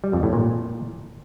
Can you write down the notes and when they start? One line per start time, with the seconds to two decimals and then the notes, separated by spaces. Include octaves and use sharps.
0.04 G3
0.13 F2
0.23 A2
0.33 A#2